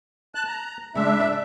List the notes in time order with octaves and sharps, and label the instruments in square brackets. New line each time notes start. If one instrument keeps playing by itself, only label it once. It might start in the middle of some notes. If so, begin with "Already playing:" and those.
[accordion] A5 F#6
A#5
[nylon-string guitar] C#3 G#3 [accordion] D4 E5
[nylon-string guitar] D5